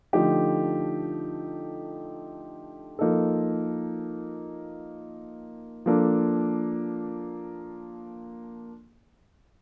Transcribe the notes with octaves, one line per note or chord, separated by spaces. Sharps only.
D3 F3 A3 D#4 G4
F3 A#3 D#4 A4
F3 A#3 D4 A4